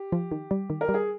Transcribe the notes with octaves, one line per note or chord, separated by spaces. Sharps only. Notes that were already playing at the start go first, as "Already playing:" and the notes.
Already playing: G4
F3
D#3
G3
D#3
A#4
G3
G#4